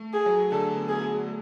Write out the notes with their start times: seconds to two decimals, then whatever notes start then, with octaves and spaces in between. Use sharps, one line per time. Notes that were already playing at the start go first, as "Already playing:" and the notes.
Already playing: A3
0.13 G#4
0.26 F#3
0.51 D3 A4
0.76 B3
0.88 G#4
1.01 B3
1.27 A3